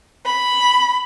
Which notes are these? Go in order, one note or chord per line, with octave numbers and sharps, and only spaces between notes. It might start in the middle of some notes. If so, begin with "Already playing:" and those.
B5